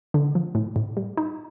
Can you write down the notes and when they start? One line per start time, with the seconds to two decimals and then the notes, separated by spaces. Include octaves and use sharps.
0.14 D3
0.35 F3
0.55 A2
0.76 A2
0.97 G3
1.17 D#4